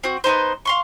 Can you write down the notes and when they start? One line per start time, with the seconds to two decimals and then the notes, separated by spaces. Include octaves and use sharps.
0.04 C4 F#4
0.24 B3 C#4 D#4 C5
0.65 F5 C6 C#6